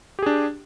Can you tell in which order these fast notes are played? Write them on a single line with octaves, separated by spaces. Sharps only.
G4 G#4 D4